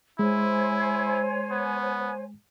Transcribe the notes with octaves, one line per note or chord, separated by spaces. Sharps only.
G#3 E4 C5 C#5 G#5
B3